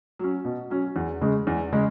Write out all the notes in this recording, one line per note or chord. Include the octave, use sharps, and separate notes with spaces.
F#3 C#4
B2
F#3 C#4
E2
C#3 G#3
E2
C#3 G#3